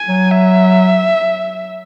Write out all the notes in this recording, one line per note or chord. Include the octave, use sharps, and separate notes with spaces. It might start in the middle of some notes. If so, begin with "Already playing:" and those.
Already playing: G#5
F#3
E5